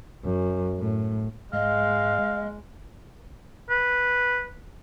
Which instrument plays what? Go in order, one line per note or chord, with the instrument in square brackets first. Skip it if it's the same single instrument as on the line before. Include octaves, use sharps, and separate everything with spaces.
[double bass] F#2
A2
[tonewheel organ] G#2 [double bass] G#3 [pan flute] D#5 [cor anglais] F5
[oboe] B4